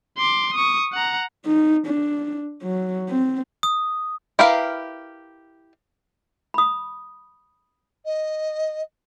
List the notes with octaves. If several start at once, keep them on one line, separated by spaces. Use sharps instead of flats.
C6 D6
C#6 D#6
F#5 A#5
D#4
D4
F#3
C4
D#6
E4 G4 A#4 B4 F5
B5 D#6
D#5